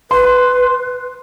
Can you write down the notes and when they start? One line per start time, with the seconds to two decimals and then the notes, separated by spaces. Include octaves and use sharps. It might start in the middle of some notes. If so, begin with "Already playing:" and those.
0.11 B4 C6